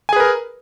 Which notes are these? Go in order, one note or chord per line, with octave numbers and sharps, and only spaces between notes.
G#4 A#4 B4 G#5